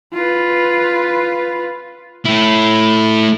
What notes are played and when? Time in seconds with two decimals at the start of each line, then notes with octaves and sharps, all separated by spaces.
0.13 F4 B4
2.25 A3 E4